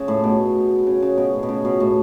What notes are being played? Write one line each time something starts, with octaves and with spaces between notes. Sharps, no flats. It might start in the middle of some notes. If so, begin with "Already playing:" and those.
Already playing: C#3
A2
B2
C#3
C#3
B2
A2
B2
C#3
B2
A2